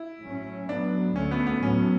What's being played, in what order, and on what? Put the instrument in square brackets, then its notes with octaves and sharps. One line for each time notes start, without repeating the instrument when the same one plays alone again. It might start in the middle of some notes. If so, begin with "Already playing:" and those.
Already playing: [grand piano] E4
[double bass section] A2 F#3 C#4
[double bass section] A2 F#3 B3 [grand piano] D4
[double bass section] D2 D3 A3 [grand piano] C#4
[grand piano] B3
B3
[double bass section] A2 F#3 B3 [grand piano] C#4